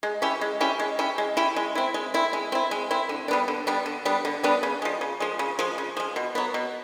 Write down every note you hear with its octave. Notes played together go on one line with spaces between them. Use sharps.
G#3
C#4 E4 G4
G#3
C#4 E4 G4
G#3
C#4 E4 G4
G#3
C#4 E4 G4
G#3
C4 E4
G#3
C4 E4
G#3
C4 E4
G#3
C4 E4
D3
G3 B3 D4
D3
G3 B3 D4
D3
G3 B3 D4
D3
G3 B3 D4
C#3
F3 G#3
C#3
F3 G#3
C#3
F3 G#3
C#3
F3 G#3
B2
F#3 B3
B2